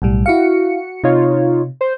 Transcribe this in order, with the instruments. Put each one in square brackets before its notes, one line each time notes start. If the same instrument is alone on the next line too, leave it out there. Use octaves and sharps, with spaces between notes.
[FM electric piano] B1 A2 G3
[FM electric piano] E4 F5 [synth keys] F#4 C#7
[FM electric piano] C3 [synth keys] D#4 F4 C#5
[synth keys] C5